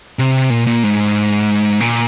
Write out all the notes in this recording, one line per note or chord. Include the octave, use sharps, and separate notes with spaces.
C3
A#2
A#2
G#2
A#2